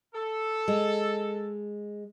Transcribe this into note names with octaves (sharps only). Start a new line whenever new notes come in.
A4
G#3